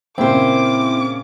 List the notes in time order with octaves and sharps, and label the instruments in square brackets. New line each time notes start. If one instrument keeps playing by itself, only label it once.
[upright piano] A#2 C#3 A#3 [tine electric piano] C4 [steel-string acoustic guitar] E4 C5 [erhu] D6